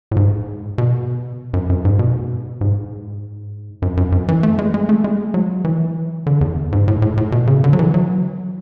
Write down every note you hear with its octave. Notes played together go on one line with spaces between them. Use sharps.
A2
G#2
B2
F#2
F#2
G#2
B2
G#2
F#2
F#2
F#2
E3
A3
G#3
G#3
A3
G#3
F#3
E3
D3
E2
G#2
A2
A2
A2
B2
C#3
D3
F#3
E3
F#3